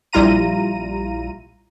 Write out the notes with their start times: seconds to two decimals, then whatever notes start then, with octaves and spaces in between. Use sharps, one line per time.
0.13 A#1 G3 E4 F4 A#5 D#7